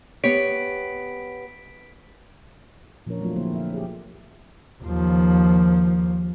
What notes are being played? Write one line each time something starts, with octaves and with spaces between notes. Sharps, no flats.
B3 G4 C#5 B6 D7
A#2 F3 C#4 D4 A#4 C#5
F#3 A3 C4 F4
D3 F3 A#3 E4 G#4 C5
E5 F5
G4 G#4 C#5
D#2 F3